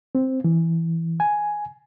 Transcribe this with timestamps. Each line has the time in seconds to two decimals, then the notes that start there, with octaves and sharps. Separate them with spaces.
0.15 C4
0.44 E3
1.20 G#5